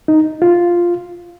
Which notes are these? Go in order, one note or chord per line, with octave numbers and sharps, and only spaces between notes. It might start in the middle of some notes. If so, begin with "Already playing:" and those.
D#4
F4